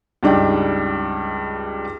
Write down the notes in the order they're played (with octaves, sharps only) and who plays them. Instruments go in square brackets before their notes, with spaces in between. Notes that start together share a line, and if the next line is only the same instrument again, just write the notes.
[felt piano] C#2 G2 D4 D#4 G5